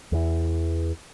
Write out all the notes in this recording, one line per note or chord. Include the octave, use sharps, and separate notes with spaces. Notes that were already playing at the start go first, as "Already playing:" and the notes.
E2 E3